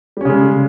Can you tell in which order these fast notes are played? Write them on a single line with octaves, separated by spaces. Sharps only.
G3 C#4 C#3 G#3